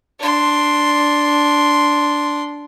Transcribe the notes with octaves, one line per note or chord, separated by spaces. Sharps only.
D4 C6